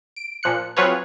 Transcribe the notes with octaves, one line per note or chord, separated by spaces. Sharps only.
D7
A#2 F3 F#6 C#7
F#3 C4 F4 G#4 B4 C#5